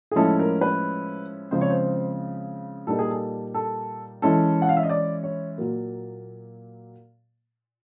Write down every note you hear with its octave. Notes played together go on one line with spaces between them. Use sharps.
G#4
A2 F3 G#3 C#4 E4 A4
A#4
B4
C#3 F3 G#3 C4 C5
C#5
C5
A#2 G3 A#3 D#4 A4
G#4
A4
A4
E3 G#3 C#4 E4 A4
F#5
F5
E5
D#5
D5
C#5
A#2 F#3 A#3